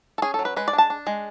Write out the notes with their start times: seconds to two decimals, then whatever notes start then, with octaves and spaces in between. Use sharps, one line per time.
0.18 A4
0.22 C#4 G#4
0.34 A4
0.39 F#3
0.45 B4
0.56 G#3 B4
0.68 D5
0.73 D4
0.78 A5
0.90 D4
1.07 G#3